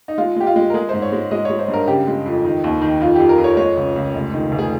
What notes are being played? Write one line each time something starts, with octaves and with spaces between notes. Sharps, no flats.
D#4
G#3 F4
G#3 G4
F4
G#3
A#4
G#3 G#4
G#2 C5
C#5
G#3
G#3 D#5
G#3 C#5
C5
G2
A#4
C#3 G4
G#3
F2
D#3
D#2
D#3
F2 F4
F2 G4
A#4
F2
C#5
G#3 C#5
C#2
C#2
F1
D#3
F1
G#4